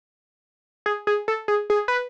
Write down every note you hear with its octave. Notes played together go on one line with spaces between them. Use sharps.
G#4
G#4
A4
G#4
G#4
B4